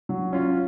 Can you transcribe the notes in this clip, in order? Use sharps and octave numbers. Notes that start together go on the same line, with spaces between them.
F#3
C#4 F4